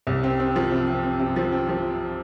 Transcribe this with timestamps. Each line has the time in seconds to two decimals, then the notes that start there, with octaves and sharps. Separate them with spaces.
0.07 C2
0.24 C4
0.40 C4
0.56 F3
0.71 C3
0.87 C4
1.04 C4
1.19 C3
1.36 F3
1.52 C4
1.69 F3